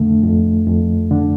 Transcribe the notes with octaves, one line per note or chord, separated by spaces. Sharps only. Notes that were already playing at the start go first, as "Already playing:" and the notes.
Already playing: F2 D3 A3
F2
F2
D3